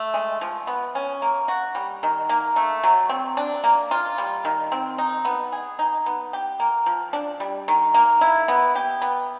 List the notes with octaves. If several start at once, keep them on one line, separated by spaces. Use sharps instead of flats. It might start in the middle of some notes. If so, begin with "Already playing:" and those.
Already playing: A3
G#3
F3
B3
C#4
A#3
F#4
G3
D#3
A#3
A3
F#3
C4
D4
A#3
F4
G3
D#3
C4
D#4
B3
G#4
D#4
B3
G4
A#3
F3
D4
G3
D#3
A#3
E4
B3
G4
B3